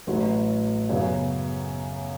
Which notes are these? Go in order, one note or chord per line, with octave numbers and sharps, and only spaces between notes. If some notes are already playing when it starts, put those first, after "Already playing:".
A1 A2 F#3
F#2 C#3 F#3 B3